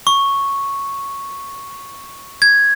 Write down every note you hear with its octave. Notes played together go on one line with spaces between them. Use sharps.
C#6
G#6